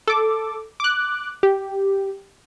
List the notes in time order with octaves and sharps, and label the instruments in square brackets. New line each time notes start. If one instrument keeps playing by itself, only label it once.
[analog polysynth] A4 D6
D6 F#6
G4